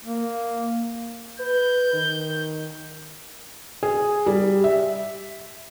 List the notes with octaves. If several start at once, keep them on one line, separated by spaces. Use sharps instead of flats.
A#3
B4 G6
D#3
G#4
G3
E5